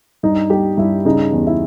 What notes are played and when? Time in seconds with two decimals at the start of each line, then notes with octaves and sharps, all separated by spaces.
0.23 G2 D#4
0.50 G3 G4
0.77 G2 E4
1.05 C#3 D#4
1.32 E2
1.47 E4